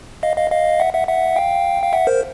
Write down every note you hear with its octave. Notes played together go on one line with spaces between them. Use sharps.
D#5 F5
D#5 F5
D#5 F5
E5 F#5
E5 F#5
E5 F#5
F5 G5
F5
E5 F#5
A#4 C5